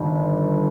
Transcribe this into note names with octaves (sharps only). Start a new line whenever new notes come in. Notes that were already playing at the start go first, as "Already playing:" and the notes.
Already playing: G1 G2 D#3